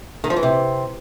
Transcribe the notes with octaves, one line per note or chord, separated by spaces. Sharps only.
D#3
F3
E3
C3